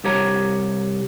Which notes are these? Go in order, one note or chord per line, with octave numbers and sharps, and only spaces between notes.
C2 G4 C#5 A#5